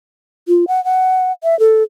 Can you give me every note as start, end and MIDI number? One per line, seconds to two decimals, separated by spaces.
0.48 0.65 65
0.68 0.83 78
0.85 1.32 78
1.43 1.58 76
1.60 1.83 69